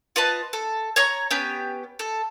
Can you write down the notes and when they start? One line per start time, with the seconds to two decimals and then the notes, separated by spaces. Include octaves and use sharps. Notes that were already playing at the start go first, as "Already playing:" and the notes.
0.16 F4 B4 D#5 A5
0.53 A4
0.96 C#5 A#5 C#6
1.31 B3 C#4 G4 G5
1.99 A4